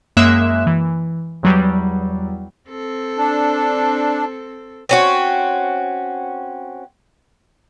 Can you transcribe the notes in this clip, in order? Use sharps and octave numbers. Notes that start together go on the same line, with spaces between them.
F#2 G#3 A#3 E5 F#6 E7
E3
E2 F#3 G3
C4 A4
D4
C4 C#4 F#4